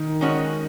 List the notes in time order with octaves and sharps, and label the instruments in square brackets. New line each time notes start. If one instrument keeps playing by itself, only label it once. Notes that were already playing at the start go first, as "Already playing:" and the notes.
Already playing: [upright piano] D#3
[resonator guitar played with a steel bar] G#3 C#4 F#4 D#5